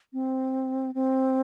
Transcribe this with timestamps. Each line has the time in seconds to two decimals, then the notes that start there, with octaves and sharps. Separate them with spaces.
0.13 C4
0.95 C4